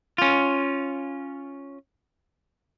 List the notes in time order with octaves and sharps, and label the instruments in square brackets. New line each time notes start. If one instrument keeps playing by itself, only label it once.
[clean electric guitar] C#4 F4